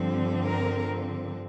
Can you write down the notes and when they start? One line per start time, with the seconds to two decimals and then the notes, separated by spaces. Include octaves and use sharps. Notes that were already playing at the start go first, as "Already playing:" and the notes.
Already playing: G2 D3 F3 C4
0.43 A#4